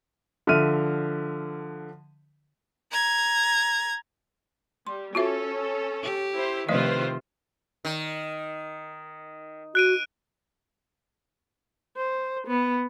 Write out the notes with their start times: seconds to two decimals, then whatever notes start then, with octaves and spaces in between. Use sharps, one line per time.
0.47 D3 F3 E5 F6 D#7
2.92 A#5 G#6
4.87 G3 C6
5.15 C#4 F4 F#4 A4 E5
6.03 G4
6.35 E4 C5
6.69 C3 D#3 F3 A3 F4 B4 C5 D#5
7.85 D#3
9.75 F#4 F#6 D7 D#7
11.97 C5
12.47 B3